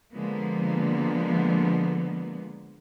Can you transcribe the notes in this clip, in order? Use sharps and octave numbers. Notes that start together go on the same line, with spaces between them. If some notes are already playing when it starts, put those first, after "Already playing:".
D3 F3 G#3 A#3 B3